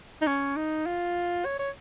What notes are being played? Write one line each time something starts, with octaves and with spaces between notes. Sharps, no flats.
D#4
C#4
D#4
F4
C#5
C#5